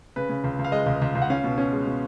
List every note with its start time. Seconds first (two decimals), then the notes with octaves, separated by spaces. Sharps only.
0.16 C#3 B4
0.29 C#3
0.44 C#2
0.59 C#2
0.65 F5
0.72 G#3 D#5
0.86 C#2
1.02 C#2
1.15 C#2
1.22 F#5
1.30 C#4 F5
1.44 B2
1.58 C#4
1.72 G#3
1.87 B2